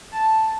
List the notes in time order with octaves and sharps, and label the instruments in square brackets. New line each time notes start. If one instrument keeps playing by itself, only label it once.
[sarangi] A5